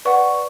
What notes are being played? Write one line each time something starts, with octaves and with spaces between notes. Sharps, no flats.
B4 D5 F#5 C#6